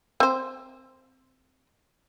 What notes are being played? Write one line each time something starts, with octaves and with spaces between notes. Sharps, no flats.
C4 C5